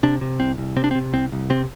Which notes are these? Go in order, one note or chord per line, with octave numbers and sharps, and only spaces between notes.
C3 D4
C3
C2 C4
C2
C3 C4
D4
C4
C3
C2 C4
C2
C3 C4